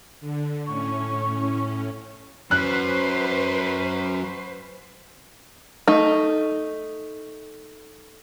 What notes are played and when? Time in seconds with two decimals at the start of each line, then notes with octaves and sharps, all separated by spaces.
0.21 D3
0.67 A2 C#4 C#6
2.51 F#3 C#4 B4 C5 F#6
5.88 A3 D#4